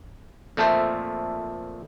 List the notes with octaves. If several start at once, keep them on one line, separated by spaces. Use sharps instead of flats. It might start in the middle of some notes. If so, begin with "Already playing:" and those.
F2 A#2 A3 A4 C5 E5